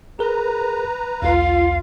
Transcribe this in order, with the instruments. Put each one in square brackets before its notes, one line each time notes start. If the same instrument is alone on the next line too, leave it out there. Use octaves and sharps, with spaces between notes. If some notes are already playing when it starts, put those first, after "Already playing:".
[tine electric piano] G#4 A#4 [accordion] B4 A#5
[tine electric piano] B1 E2 [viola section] F4 [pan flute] F5